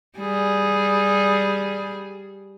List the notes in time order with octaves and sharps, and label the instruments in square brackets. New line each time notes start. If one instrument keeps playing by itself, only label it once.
[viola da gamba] G3 G#4